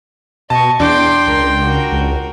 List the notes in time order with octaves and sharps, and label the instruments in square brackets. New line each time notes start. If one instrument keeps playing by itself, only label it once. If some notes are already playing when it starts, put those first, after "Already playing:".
[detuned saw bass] B2 [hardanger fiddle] D#5 C#6 [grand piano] A5
[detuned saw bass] E2 [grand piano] D4 [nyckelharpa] G5 [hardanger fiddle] C6 D6
[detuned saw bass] C#2 [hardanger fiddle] A#4 C6
[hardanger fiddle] F#4 A#4
[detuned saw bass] C#2